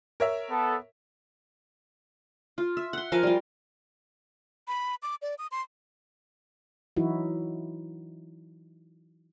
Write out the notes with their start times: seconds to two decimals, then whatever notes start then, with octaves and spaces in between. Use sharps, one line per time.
0.20 A#4 C#5 E5
0.51 B3 A4
2.58 F4
2.77 E5
2.93 F#5 C6
3.12 F3 A#4 F5 G#5
3.23 G3 F4
4.68 B5
5.03 D6
5.22 D5
5.39 D#6
5.52 C6
6.97 E3 F#3 D#4 E4 F#4